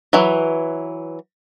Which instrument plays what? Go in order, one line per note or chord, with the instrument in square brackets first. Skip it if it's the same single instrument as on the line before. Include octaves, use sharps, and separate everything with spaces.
[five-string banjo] E3 F#3